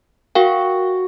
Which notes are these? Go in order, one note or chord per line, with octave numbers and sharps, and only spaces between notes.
F#4 A#4 F5 G5